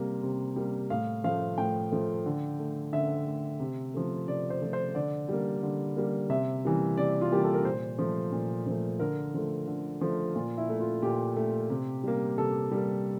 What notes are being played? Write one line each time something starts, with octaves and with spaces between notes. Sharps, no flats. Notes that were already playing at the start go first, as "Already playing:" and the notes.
Already playing: C3 G3 A#3
C3
G3 A#3
A2 F5
F3 A3 F5
A2 G5
F3 A3
D3
A3
D3 E5
A3
C3
F3 A3
C3 D5
C5
F3 A3
C5
D3 D5
G3 A#3
D3
G3 A#3
C3 E5
E3 G3 A#3
C3 D5
F4
E3 G3 A#3 G4
A4
A#4
A#2 C5
F3 A3
A#2
F3 A3
D3 A#4
F3 A3
D3
F3 A3
A#2 F4
E4
A3
F4
A#2 G4
A3
C3
G3 A#3
C3 A4
G3 A#3